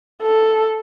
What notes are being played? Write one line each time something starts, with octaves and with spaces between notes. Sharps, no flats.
A4